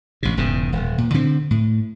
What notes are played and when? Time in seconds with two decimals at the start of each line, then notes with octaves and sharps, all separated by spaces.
0.23 A1 C3
0.37 E1 E2 G#2 C#3
0.72 D#1
0.98 A#2
1.14 D3 C4
1.51 A2